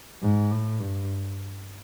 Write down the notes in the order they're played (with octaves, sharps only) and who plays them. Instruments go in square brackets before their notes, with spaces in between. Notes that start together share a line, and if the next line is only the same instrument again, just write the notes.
[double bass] G#2
A2
G2